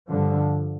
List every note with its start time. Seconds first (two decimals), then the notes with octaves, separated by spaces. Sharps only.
0.09 G2 D3 F3